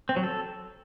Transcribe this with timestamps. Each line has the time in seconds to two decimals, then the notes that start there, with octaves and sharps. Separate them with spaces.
0.09 C4
0.16 F#3
0.23 A4